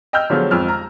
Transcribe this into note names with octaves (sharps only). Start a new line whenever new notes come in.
D#5 G5 E6 F6 G6
D3 F3 F#3 G#3 B3
G#1 F2 E6 F6
A#5